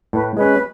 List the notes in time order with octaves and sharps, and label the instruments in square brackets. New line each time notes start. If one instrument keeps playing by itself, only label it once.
[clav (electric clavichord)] A2 [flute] B4
[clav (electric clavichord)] G#3 C#4 [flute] B4